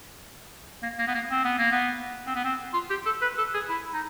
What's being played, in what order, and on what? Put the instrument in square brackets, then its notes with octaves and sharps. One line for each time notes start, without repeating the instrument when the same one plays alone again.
[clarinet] A#3
A#3
B3
A#3
C4
B3
A#3
B3
C4
B3
C4
F4
G4
A4
B4
A4
G#4
E4
D#4